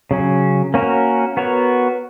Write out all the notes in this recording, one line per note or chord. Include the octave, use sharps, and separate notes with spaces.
C#3 F#3 C#4
A#3 C#4 F#4 A#4
B3 F#4 A#4 C#5